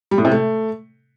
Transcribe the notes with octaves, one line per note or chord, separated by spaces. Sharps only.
G3
A2
C3
A3